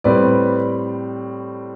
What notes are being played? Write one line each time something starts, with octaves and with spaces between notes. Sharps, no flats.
A2 G3 C4 B4 D5